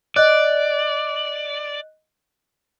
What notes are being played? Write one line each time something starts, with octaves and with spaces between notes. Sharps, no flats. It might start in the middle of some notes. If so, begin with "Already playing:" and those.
D5 D#5 F#6